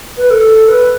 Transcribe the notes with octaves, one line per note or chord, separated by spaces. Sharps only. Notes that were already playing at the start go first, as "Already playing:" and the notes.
B4
A4
B4